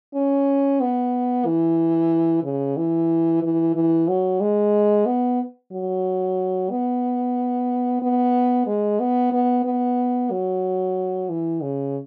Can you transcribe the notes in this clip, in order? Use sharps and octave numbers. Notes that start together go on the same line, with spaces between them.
C#4
B3
E3
C#3
E3
E3
E3
F#3
G#3
B3
F#3
B3
B3
G#3
B3
B3
B3
F#3
E3
C#3